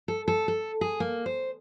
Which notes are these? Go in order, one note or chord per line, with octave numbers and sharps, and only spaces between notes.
A4
A4
A4
G#4
A#3
C5